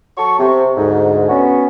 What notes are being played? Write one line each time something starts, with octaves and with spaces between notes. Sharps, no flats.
F#3 F#4 A4 C#6
C3
D2 G#2
B3 C#4 F#4